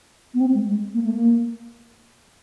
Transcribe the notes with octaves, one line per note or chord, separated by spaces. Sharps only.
B3
C4
G#3
G#3
A#3
A3
A#3